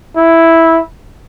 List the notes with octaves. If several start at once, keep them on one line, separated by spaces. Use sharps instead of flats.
E4